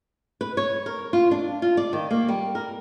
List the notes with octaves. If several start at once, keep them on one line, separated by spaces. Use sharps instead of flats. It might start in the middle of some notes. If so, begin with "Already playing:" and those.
B4
C#5
A#4
F4
D4
F4
D5
D#3
A#3
G3
A#4